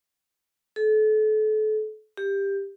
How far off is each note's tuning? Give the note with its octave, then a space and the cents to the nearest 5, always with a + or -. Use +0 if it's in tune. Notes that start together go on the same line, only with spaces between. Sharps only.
A4 -35
G4 +15